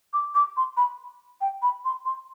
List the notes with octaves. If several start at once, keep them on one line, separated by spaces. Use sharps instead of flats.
D6
D6
C6
B5
G5
B5
C6
C6